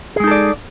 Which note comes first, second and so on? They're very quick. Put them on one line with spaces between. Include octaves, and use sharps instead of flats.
G#4 G#3 D#4 A4 D5